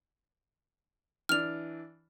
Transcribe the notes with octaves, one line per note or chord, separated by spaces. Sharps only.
E3 D4 F6 F7